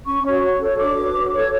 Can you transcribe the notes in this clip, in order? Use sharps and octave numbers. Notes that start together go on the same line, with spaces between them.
C#4 C#6
F#4 C#5
F#4
A4 C#5
D4 D6
F#4 B4
F#4
A4 C#5